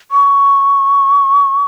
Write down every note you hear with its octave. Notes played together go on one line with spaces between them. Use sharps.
C#6